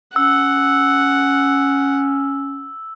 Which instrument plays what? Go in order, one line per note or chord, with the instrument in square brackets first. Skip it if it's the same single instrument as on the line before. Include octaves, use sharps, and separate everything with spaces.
[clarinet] C#4 [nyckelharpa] F#5 [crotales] E6